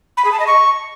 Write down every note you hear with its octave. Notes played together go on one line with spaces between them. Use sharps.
B5
G#4
A5
D#5
C#6